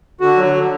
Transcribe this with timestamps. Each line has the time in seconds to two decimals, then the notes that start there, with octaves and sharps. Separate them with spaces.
0.21 D3 F#4
0.37 F#3
0.54 D3